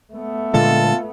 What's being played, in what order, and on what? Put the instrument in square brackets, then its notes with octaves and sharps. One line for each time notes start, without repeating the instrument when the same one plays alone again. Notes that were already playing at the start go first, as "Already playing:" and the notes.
[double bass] A3 B3
[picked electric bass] A#2 D3 G#3 [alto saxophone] F4 [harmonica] A4